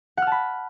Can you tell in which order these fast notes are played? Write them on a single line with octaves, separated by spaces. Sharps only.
F#5 F6 A5 B5